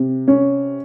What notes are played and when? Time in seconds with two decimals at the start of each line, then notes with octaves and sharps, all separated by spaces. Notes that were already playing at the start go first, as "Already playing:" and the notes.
Already playing: C3
0.28 C#4